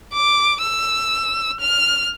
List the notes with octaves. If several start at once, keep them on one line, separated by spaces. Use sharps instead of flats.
D6
E6
F6